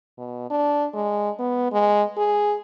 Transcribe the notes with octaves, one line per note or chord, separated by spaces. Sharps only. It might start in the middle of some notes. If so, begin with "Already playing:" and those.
B2
D4
G#3
B3
G#3
G#4